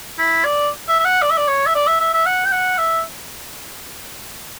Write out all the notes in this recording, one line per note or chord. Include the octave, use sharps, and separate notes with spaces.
E4
D5
E5
E5
F#5
D5
E5
D5
C#5
E5
D5
E5
E5
E5
F#5
G5
F#5
E5